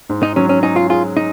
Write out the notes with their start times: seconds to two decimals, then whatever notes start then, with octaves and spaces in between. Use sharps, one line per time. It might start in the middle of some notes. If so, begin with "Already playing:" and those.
0.09 G#2
0.23 D#4
0.36 F#3 C#4
0.49 C#4
0.63 C#4 D#4
0.76 F4
0.90 F4 G#4
1.17 D#4